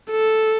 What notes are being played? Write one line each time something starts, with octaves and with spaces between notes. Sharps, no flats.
A4